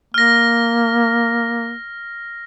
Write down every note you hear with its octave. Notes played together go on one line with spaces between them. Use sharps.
A#3 F6 A#6